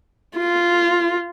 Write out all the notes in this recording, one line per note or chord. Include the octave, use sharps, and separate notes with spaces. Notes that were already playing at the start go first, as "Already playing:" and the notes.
F4